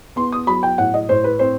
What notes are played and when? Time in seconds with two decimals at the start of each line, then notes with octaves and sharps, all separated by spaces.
0.16 B3 C6
0.32 D#6
0.47 F#3 B5
0.63 G5
0.78 A2 F#5
0.94 D#5
1.09 A2 C5
1.24 B4
1.39 C4 C5